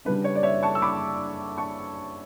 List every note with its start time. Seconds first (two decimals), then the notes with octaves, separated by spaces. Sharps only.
0.05 C#3 G3 D4 B4
0.24 C#5
0.35 D5
0.43 C#5 E5
0.63 A5 C#6
0.75 E6
0.82 B5 D6
1.58 A5 C#6